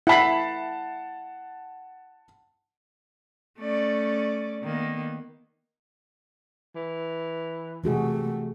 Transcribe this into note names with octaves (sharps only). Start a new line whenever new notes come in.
E4 F#5 A5 B5 C7
A3 C#4 D5
D#3 A#3 B3
E3
C3 E3 A3 F#4 G#4